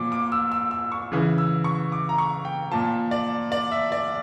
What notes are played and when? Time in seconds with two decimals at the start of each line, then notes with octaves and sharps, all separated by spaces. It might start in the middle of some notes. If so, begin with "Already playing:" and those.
Already playing: A#2 F3 D6
0.12 D6
0.32 E6
0.52 E6
0.71 E6
0.92 C#6
1.12 C#3 E3
1.38 E6
1.64 C#6
1.92 D6
2.09 A#5
2.18 C#6
2.45 G5
2.71 A#2 F3 A5
3.11 D5
3.52 D5
3.71 E5
3.92 D5